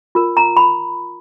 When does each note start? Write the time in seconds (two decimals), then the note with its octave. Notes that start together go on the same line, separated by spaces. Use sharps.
0.15 F4 A#4
0.37 A#5
0.57 B5